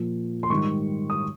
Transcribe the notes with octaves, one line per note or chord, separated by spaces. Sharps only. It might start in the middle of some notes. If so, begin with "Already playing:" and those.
Already playing: A#2 F3
C6
G#2 D#3 G3 C#6
D#6